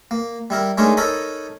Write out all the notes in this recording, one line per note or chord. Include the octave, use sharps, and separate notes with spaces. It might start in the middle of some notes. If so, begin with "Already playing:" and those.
A#3
G3 E4 A#4
G#3 A3 D4 D#4 A#4 C#5
D#4 A4 A#4 C#5 B5